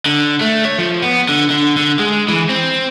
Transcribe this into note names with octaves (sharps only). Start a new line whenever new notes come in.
D3
A3
C#5
F3
B3
D3
D3
D3
G#3
E3
C4